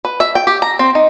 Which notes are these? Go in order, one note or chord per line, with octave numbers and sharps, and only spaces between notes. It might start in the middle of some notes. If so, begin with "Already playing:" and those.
B4
E5
G5
G4
A#5
C4
D#4